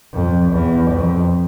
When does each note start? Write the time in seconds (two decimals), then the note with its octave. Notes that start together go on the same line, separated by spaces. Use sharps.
0.14 F2
0.53 E2
0.92 F2